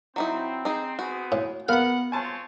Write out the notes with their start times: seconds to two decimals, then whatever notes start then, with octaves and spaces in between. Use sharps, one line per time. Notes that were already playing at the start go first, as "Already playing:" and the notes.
0.16 F#3 C4 D#4 E4
0.65 D#4 G#4
0.99 B3 C4 F#4 G#4
1.32 A2
1.69 B3 A#4 F5 F#5 B5
2.12 C4 F4 C#5 G#5 A5